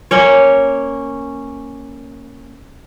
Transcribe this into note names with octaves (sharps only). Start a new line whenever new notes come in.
A#3 C#4 C#5